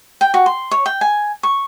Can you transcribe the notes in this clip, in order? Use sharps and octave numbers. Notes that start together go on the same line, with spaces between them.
G5
F#4
C6
C#5
G5
G#5
C#6